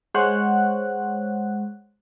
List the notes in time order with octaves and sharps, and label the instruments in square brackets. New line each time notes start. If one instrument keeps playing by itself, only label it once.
[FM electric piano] G#3 C5 C#5 F#5 F#6